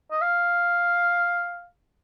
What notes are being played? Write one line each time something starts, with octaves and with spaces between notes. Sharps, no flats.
D#5
F5